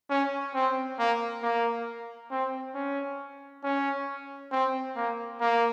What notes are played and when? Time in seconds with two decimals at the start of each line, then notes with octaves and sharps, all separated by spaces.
0.10 C#4
0.54 C4
0.99 A#3
1.42 A#3
2.31 C4
2.75 C#4
3.64 C#4
4.52 C4
4.96 A#3
5.41 A#3